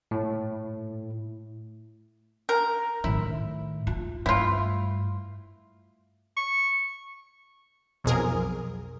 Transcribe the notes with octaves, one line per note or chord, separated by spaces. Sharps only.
A2
A#4
A2 D#3 E4
F4
G2 A3 E4 F4
C#6
B1 F2 G#4 A#4